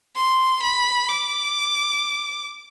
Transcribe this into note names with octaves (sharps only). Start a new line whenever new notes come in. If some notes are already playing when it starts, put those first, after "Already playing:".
C6
B5
D6